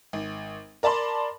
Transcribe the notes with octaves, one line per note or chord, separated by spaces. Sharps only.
G#1
A#4 D5 A5 B5 C6